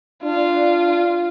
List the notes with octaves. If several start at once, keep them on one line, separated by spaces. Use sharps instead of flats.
D4 F4